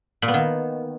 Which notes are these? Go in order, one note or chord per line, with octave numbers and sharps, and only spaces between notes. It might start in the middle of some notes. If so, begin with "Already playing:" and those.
A#2
B3
D#3